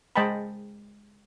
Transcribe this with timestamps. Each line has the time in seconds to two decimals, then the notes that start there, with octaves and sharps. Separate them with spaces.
0.16 G#3 C5 D#5 G5 A5 B5